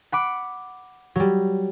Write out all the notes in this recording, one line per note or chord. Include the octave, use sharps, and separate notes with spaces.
F#5 B5 D6
F#3 G3